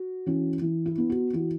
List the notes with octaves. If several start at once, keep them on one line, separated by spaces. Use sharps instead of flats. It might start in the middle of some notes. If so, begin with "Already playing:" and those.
Already playing: F#4
E3 C#4
E3
E4
B3
F#4
E3 F#4